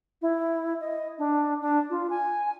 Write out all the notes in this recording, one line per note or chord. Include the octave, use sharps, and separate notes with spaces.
E4
D#5
D4
D4
F4
G#5